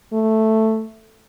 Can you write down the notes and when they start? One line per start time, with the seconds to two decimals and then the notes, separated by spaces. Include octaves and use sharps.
0.13 A3